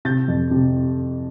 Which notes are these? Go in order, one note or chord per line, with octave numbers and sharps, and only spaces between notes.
C3 G6 A6
F2
C3